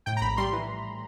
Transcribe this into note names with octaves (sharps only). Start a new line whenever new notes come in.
A2 G5
A#5
A#1 B5
G3 C6
E3